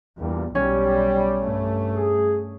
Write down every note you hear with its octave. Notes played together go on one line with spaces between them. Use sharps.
E2 G2 A#2 G3
B1 G3 C#4
G2 A3
G#4